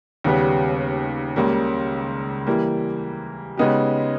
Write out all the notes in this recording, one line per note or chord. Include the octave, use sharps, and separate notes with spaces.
D#2 C#3 G3 B3 G4
C#2 C#3 G3 A#3
E3 G3 A#3
C#3 G#3 B3 D#4 G4